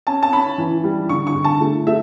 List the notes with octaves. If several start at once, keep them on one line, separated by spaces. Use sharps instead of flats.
C#4 A5
A5
C#4 B5
E3
G3
D3 C#6
C#6
D3
A5
A3
A3 E5